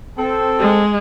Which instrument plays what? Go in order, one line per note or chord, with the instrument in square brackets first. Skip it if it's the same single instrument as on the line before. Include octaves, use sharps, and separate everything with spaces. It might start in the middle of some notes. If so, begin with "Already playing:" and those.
[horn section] C4 A4
[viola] G#3